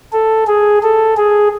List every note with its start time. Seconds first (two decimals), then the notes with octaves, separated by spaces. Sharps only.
0.13 A4
0.47 G#4
0.83 A4
1.17 G#4